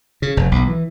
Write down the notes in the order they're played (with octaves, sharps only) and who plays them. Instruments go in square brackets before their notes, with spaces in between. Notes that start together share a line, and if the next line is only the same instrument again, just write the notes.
[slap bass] C#3
F1
B1
E3